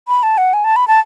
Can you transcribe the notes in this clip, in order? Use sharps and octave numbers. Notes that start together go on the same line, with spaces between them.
B5
A5
F#5
G#5
A5
B5
A5